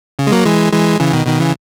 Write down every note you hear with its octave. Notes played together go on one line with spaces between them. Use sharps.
C#3
G#3
F#3 A#3
E3 G#3
E3 G#3
C#3 E3
B2 D#3
B2 D#3
C#3 E3